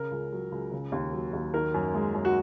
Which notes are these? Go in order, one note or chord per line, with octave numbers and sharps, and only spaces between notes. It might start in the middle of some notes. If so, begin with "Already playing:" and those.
Already playing: C#3 A#4
C#2
F#3
C#2
C#3
D#2
F#3
D#2
D#3 A#4
F#2
G#3
F#2
F#4